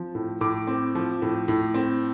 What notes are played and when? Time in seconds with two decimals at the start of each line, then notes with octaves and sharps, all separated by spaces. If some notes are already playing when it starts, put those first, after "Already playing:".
Already playing: F3 C4
0.15 A2
0.41 A2 D6
0.67 C4
0.95 F3
1.22 A2
1.48 A2
1.74 C4